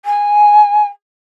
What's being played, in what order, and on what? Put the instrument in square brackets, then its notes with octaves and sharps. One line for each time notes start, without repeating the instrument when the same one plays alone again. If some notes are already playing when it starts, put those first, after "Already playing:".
[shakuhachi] G#5